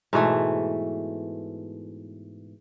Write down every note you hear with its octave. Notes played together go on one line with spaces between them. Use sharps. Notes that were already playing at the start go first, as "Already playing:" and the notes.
G#2 B2 E3 A3